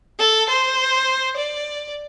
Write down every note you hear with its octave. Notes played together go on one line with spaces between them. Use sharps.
A4
C5
D5